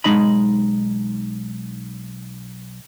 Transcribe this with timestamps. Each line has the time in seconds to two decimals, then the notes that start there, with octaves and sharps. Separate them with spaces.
0.04 B1 G#3 D#4 D#5 B5